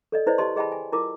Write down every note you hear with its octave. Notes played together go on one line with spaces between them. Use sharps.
A4 D5 D#5
E4 B4 C5 D5 D#5
G4 D#5 A5 C6
G#4 D#5 G5 A5 B5
G#5
E4 F4 A#4 D6